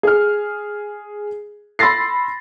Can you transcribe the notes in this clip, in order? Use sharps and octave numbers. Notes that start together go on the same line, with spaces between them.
G#4 F6
B5 C6 E6 A6 A#6 C7